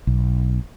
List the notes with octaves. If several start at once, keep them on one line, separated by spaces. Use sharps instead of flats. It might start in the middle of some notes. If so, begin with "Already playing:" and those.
B1